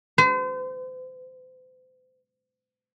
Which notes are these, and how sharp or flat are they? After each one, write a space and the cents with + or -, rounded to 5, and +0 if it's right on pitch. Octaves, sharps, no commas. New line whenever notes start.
C5 -40